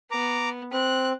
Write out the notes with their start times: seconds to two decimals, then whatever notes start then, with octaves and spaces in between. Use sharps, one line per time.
0.11 B3 A#5 D6
0.73 C4 F#6